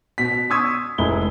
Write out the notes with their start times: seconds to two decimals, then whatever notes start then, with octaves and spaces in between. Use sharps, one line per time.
0.18 B2 B6
0.50 C6 C#6 D#6 E6 G#6 B6
0.98 F1 G#3 E4 G7